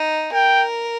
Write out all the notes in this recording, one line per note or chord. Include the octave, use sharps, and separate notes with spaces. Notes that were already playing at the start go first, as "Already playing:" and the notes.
Already playing: D#4
A#4 G5